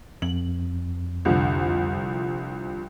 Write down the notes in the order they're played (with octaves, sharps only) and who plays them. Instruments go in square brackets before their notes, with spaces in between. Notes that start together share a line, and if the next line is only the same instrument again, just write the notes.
[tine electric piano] F2 [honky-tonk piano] F#7
[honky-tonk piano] C2 D3 F3